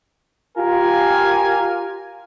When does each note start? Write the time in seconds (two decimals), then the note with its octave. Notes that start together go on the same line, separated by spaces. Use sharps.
0.57 F4 G4 A#4 G#5